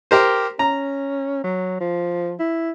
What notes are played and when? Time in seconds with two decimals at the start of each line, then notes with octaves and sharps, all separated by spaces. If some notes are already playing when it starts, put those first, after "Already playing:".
0.11 G4 A#4 C5
0.59 C#4 A#5
1.44 F#3
1.80 F3
2.40 E4